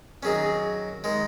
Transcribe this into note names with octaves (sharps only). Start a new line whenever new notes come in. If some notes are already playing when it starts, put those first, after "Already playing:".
D#3 F#3 C#4 G#4
D#3 G#3